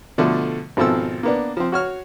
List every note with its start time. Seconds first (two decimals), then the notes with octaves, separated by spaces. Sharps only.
0.18 B2 D3 F3 A3
0.77 G#1 B2 F3 C4 A4 E6
1.23 A#3 B3 D4
1.57 F3 C4
1.72 F#4 C#5 F6